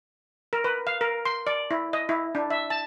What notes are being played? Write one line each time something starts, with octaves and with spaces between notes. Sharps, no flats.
A#4
B4
F5
A#4
C6
D5
E4
D#5
E4
D4
E5
A5